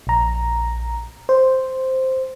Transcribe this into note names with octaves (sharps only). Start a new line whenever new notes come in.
A#1 A#5
C5